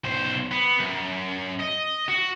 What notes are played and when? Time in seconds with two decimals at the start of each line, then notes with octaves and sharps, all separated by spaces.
0.04 B1 C5
0.51 B3
0.80 F#2
1.60 D#5
2.09 F#4